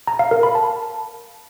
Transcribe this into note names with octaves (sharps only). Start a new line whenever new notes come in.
A#5
F5
A#4
B5
A5